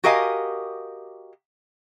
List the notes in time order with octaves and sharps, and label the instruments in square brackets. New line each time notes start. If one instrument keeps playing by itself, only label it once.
[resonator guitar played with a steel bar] F#4 G4 A#4 D#5 F5 G#5